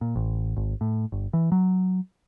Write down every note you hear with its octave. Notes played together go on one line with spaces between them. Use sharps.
A#2
A1
G#1
A2
G1
E3
F#3